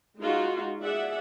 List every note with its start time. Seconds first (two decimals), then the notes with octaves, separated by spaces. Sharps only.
0.19 G#3 D#4 F4 F#4
0.82 G#4 D5 E5 F#5